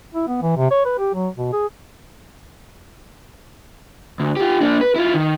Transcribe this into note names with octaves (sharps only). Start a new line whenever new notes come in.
E4
B3
E3
C3
C#5
B4
G4
F#3
B2
G#4
D2
F4 G4
A#3 D4
B4
E4 F4
D#3